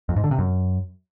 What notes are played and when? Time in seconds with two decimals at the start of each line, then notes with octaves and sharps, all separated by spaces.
0.09 F2
0.16 G#2
0.24 D3
0.31 C3
0.39 F#2